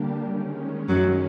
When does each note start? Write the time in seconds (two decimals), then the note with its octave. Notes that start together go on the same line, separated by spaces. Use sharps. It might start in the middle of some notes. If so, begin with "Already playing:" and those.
Already playing: D3 G3 A#3 D4 G4
0.25 D#3 G#3 C#4
0.89 F#2 F#3